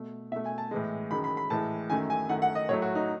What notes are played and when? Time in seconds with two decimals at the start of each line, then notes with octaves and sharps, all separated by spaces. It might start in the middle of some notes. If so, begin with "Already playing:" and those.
Already playing: B2 A3
0.31 B2 E5
0.36 A3
0.46 G#5
0.58 A5
0.71 A2 E3 G#3
1.11 F#2 D#3 G#3 B5
1.24 B5
1.37 B5
1.50 A2 E3 G#3 A5
1.90 F#2 D#3 A3 G#5
2.10 G#5
2.29 F#2 D#3 A3 F#5
2.42 F#5
2.55 D#5
2.69 A2 F#3 A3 C#5
2.82 F#4
2.95 D#4